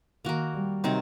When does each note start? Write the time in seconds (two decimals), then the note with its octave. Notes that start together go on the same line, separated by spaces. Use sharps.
0.24 D#3 A#3 F#4 A#4
0.53 G3
0.84 C3 D#3 F#3 C4